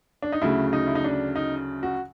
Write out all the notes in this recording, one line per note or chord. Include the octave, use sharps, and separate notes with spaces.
D4
D#4
D2 C#3 F#3 A3 E4
D#4
E4
D#4
D4
D#4
F#4